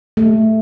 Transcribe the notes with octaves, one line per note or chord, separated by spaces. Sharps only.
A3